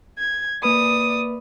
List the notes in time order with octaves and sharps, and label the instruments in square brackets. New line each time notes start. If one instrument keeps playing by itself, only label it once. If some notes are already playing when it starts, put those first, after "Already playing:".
[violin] G#6
[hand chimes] A#3 B4 B5 [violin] D5 D#6